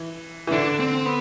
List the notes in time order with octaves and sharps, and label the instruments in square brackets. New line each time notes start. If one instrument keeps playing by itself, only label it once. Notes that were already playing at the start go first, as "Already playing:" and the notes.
Already playing: [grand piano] E3
E3
[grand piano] D3 [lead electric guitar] D4
[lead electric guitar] C4
B3